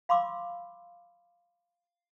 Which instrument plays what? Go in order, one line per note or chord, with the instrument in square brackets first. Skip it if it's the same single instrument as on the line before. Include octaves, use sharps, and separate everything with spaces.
[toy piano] F5 B5 C6 D6 E6